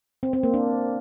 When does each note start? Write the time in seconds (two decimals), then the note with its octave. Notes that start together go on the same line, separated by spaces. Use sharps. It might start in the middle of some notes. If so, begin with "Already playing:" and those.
0.23 C4
0.33 C4
0.43 A#3
0.54 D4